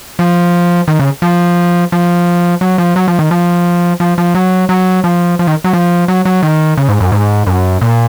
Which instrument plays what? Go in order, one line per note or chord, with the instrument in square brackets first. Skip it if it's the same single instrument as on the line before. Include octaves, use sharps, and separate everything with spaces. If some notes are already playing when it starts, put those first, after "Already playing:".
[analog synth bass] F3
D#3
C#3
F3
F3
F#3
F3
F#3
F3
D#3
F3
F3
F3
F#3
F#3
F3
F3
D#3
F#3
F3
F#3
F#3
D#3
C#3
G#2
F#2
G#2
F#2
A#2